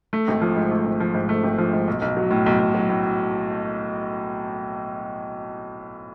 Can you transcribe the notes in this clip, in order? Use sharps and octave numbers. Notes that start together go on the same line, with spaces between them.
A3
G#1
F3
G#2
A3
G#1
F3
G#2
A3
G#1
F3
G#2
B1
B1
F#3
A2
B1
B1
F#3
A2